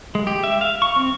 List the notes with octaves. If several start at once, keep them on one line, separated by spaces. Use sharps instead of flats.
G#3
G4
E5
F5
C#6
C4